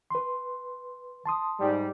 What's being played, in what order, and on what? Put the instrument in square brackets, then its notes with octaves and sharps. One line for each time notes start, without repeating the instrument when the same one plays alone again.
[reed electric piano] B4 C6
A5 C6 D#6
[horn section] G#2 G3